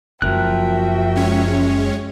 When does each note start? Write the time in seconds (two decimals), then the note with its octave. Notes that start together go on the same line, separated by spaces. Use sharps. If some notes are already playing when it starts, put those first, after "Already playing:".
0.22 F#1 F#2 F3 F#4 A#4 E5 G5 F#6
1.15 G#3 C#4 C#5